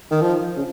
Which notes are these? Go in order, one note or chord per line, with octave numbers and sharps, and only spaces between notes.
D#3
F3
C#3